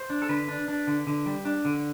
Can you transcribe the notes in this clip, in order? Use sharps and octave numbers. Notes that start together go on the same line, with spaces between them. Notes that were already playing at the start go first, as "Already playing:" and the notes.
Already playing: C5
D4
A4
D3 B4
D4
D4
D3
D3
G3
D4
D3